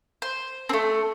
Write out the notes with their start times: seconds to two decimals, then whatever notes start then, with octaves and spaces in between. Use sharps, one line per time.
0.22 C5
0.69 A3 C4